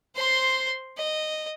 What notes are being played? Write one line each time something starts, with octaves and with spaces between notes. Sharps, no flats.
C5 C6
D#5